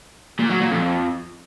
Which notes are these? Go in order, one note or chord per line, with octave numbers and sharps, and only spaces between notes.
A#2
F#3
A#2
F2